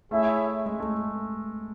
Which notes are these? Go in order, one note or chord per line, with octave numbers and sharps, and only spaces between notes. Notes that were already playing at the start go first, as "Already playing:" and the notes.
A3 E4 G#4 C#5 E5
G#3
A3